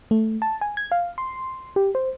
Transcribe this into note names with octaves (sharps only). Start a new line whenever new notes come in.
A3
A5
G#5
G#6
F5
C6
G4
C5